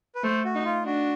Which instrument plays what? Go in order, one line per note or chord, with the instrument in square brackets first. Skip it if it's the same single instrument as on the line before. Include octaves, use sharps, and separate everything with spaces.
[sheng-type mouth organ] B4
[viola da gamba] A3 [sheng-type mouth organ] C5
[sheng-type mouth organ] F#4
[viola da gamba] D#4
[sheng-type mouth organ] F4
[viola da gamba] D4 [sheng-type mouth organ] F#4